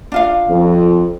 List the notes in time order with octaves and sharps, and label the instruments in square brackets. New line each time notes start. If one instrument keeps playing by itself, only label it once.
[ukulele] D4 F4 F5
[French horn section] F2